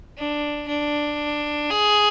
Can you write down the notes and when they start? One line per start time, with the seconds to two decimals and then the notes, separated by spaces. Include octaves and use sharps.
0.18 D4
0.68 D4
1.70 G#4